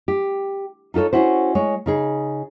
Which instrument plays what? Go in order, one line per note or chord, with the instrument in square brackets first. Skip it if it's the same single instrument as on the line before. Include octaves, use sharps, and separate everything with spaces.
[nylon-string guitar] G4
D#4 F4 G4 A4 C#5
C#4 E4 F#4 C5
G#3 C#5
C#3 D#4 G#4